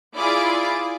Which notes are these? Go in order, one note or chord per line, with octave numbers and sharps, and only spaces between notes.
E4 F4 G#4 D5 D6